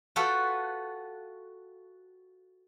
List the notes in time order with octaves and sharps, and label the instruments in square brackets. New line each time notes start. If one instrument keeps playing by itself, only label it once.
[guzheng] F4 F#4 A4 B4 G5